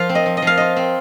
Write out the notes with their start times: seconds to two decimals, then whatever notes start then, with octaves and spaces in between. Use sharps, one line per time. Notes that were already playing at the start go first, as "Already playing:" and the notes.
Already playing: F3 F4 F5
0.09 C4
0.15 D#5
0.26 F3
0.37 D#5
0.42 F3 F5
0.57 F4 D#5
0.76 C4